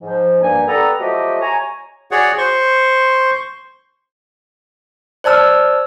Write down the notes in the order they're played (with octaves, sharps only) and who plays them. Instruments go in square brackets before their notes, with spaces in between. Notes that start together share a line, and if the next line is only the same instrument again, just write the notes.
[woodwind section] G#2 F3
G2 A#3 G#5
B3 D4 G4 A4 A#5
F3 F#3 A3 F#4 G4 D#5
C#5 G#5 A#5
[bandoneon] F#4 G#4 C#5 D5 F#5
C5 C6 C#6
[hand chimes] C5 D5 A5 E6 F6